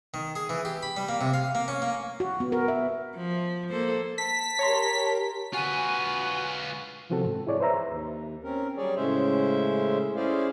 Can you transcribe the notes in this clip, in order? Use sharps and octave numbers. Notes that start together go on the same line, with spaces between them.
D#3
G#4
E3
G4
B5
G3
A#3
C3
F5
A#3
C#4
A#3
F#4
B3
A#4
E5
F3
A#3 A4 C5
A5 B6
G4 A#4 C#5 A#5 C6
F4 F#4 B4 G#5
C3 E3 F3 C4 F#4 A4
G#2
E4 G#4 C#5 D5
B4 C5 E5 A#5 E6
D#2
C4 C#4 A#4
F#3 G3 G#4 C#5 D5
A2 C#3 G#3 C#4 C5 E5
C#4 E4 G#4 C5 D5 F5